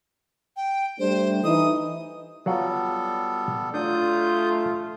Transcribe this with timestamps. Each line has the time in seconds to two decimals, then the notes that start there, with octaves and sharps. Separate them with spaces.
0.57 G5
0.99 G3 A3 D4 C5
1.44 E3 D#4 D#6
2.46 F#3 G3 B3 F4 A4 F#5
3.74 F#3 A3 D4 F4 D#6 G6